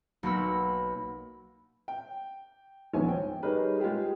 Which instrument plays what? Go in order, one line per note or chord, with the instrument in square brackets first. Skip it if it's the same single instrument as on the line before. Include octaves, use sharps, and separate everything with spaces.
[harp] B1 A#3 F#4 B5 E6
[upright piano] G5
D#1 A#1 G#2 B3 C#5 G#5
G5
G3 D#4 G#4 A#4 B4 C#5
G#3 F4 G4 G#4